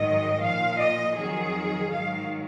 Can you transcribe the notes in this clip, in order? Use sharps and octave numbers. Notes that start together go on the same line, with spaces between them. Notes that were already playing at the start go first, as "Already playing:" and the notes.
Already playing: G#2 D#3 F#3 D#5
A#2 F3 F5
D#5
F2 D#3 F#3 G#4
G#2 D#3 F#3 F5